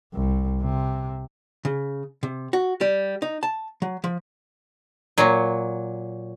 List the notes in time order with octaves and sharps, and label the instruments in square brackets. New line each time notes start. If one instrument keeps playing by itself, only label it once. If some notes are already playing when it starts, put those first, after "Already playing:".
[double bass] C2
C3
[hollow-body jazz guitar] C#3
C3
F#4
G3
D#4
A5
F#3
F3
[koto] A#2 F#3